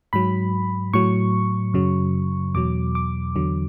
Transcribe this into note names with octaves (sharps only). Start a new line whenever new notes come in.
G#2 F#3 B5
A2 F#3 C#6
F#2 C#3 F#3
E2 B2 F#3 D6
D6
E2 D3 F#3